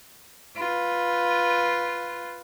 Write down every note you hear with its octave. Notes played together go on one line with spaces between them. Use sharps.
F4 B4